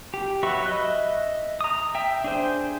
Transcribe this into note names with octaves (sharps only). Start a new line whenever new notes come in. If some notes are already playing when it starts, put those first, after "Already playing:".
G4
F#3 F#4 B4 E5 C#6
D#5 E5 F#6
A#5 D#6
E5 G5
D4 G#4 C5